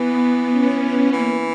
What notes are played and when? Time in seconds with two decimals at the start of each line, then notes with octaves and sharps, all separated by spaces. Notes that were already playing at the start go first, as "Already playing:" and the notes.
Already playing: E3 B3
0.52 C#4
1.12 E3 A#3